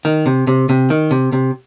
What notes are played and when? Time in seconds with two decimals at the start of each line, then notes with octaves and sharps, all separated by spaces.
0.05 D#3
0.26 C3
0.47 C3
0.69 C3
0.90 D#3
1.11 C3
1.32 C3